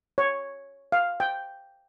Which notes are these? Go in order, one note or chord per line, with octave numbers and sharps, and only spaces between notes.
C#5
F5
G5